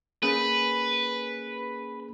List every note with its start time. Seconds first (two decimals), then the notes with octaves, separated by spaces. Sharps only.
0.23 A#3 C#4 G#4 B4